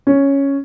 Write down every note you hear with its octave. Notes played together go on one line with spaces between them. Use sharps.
C#4